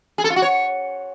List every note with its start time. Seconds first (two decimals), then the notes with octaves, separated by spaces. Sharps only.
0.18 G#4
0.24 A4
0.30 F4
0.36 F#4
0.42 C#5